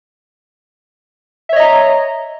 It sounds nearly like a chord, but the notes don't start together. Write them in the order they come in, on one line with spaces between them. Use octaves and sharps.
E5 C#5 D#5 A#5